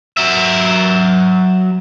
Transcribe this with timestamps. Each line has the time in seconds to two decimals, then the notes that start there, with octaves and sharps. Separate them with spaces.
0.17 F#3 E5